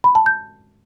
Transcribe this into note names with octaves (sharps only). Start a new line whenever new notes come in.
B5
A5
G6